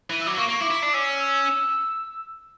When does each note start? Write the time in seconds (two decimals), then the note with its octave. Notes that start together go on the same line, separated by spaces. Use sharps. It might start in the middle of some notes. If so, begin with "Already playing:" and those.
0.10 E3
0.21 E6
0.27 F#3 D6
0.37 A#3 C#6
0.49 A#3 C#6
0.61 E4 D6
0.71 E4
0.83 D4
0.93 C#4 E6
1.18 E6